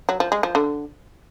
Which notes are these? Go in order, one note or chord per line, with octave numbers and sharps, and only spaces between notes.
F#3
F3
G#3
F3
D3